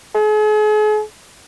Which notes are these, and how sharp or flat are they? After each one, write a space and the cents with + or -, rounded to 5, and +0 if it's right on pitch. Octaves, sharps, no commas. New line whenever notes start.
G#4 +40